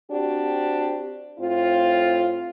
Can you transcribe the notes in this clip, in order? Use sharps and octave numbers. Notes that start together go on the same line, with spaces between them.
C4 D4 F#4 G4
A2 C4 F4